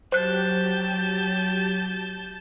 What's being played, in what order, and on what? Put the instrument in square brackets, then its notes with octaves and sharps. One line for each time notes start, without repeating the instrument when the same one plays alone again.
[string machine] F#3 G4 [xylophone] C5 F#6 [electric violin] A5 G6